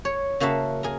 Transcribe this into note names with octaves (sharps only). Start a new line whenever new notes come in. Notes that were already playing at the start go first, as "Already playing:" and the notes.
C#5
C#3 A#3 F#4 E5 A5
G#4 A#4